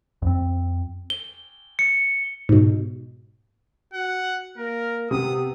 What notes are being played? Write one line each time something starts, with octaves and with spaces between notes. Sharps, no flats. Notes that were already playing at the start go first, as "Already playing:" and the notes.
F2 C4
G7
C#7
G#2 B2
F#4 F#5
A#3 A#4
C3 B3 D#6